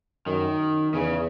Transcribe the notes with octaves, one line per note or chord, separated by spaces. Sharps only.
F#2 D#3
E2 C#3